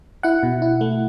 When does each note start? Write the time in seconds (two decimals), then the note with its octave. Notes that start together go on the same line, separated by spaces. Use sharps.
0.23 E4 F#5
0.43 B2
0.62 E4
0.81 A3